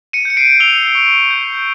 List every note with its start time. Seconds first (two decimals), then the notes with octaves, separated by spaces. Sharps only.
0.13 C#7 D#7
0.25 G6 C#7
0.37 C7 D7
0.60 E6 F7 G7
0.95 C#6
1.30 G6